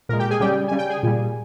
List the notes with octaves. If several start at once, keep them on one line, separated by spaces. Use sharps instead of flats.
A#2 G#3 A#4
G4 G5
G#4 G#5
C#3 G3 G4 G5
C#3 G3 G#5
G5
G#4 G#5
A#2 G3